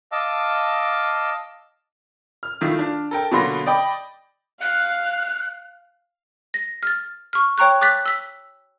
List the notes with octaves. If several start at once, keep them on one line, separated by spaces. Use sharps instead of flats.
D#5 F5 A5 D6 E6
F6
D#3 A3 E4 F4
D4
A4 A#4 G5
B2 D3 F#3 A#3 C6 A#6
D5 D#5 G5 B5
F5 F#6
A#6
F6 A6
C#6 F6
C#5 G5 A#5 C#6 F#6
D6 F#6 A6 B6
E6 B6